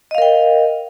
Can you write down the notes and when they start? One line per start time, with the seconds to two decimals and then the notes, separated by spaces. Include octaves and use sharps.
0.11 D#5
0.15 F5
0.18 A#4
0.22 G5